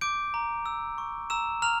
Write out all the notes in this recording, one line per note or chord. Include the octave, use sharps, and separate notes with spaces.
D6 G6 D7
A#5
E6
C#6
A#5 E6 E7
A#5 F6 F7